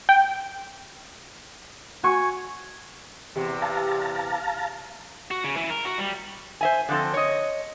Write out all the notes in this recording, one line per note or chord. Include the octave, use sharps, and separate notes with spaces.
G5
F#4 G#5 C#6
E2 C3 G4
F5 A5 A#5
F#4
C#3
E3
A#4
F#4
G3
C5 E5 G#5
D3 F3 C4 A4
C#5 D#5